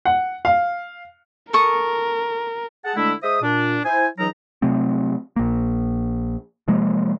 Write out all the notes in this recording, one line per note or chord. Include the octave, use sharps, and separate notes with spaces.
F#5
F5
A4 A#4 C#6 D#6
G#4 F#5 A5
D3 G#3 A3 D4 E4
G#3 C5 E5 D#6
A#2 D4
E4 C5 G#5
C#2 E3 F#3 D#4 D#5 A#5
C3 F#3 A3 C4
A#1 A#3
C3 F3 G#3 A#3